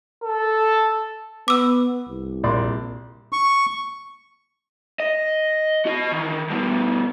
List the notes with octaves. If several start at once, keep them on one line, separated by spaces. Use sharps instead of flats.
A4
B3 D6 E6
C2
A#1 D5 C6
C#6
D#5
F#4 D#5
D#3 E3
G2 B2